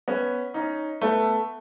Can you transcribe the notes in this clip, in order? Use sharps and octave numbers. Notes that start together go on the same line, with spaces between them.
B3 C#4
C#4 D#4
A3 B3